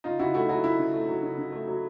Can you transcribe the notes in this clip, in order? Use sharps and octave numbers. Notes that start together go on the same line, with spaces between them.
C#3 D#4 F4
C#3 E4 F#4
A3 E4 F#4
F#3 E4 F#4
C#3 E4
C#3
A3
F#3
C#3
C#3
A3
F#3